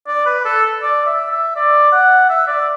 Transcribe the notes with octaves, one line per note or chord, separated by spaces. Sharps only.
D5
B4
A4
D5
E5
E5
D5
F#5
E5
D5